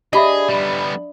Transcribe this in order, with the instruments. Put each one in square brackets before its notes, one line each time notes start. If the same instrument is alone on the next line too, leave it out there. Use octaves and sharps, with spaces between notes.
[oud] D4 [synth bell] G4 D#5 [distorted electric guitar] G#4 [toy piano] E5 B5 D#6
[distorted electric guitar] G3 B3